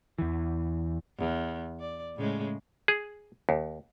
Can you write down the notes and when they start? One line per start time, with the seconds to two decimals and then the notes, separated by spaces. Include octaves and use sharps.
0.19 E2 E3
1.18 E2
1.80 D5
2.16 A2 C#3 G#3
2.88 G#4
3.49 D#2